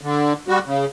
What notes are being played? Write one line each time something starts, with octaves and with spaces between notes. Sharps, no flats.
D3
G3 F#4
C#3